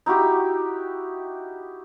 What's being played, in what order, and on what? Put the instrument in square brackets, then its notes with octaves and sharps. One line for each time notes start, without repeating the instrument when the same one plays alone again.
[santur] D#4 E4 F#4 G4